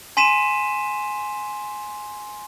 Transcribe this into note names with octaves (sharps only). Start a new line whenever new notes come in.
G#5 C6 B6 D#7 E7